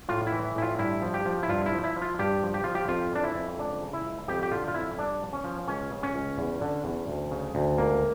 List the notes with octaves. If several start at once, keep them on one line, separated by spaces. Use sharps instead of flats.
A2 F4
E4
E3
A2 E4
F4
G2 E4
F3
G4
F3
E4
G2 F4
E4
F3
E4
F3
F4
G2 G4
F3
G4
F3 F4
G4
F2 F4
E3 D4
E4
F2
C#2 D4
C#3
E4
C#2
F2 G4
G4
D3 F4
F4
F2 E4
G2 D4
F3
C#4
F3
C#2 C#4
C#3
C#4
C#2
E2
D3
E2
D2
C#3
D2
C#2 A#3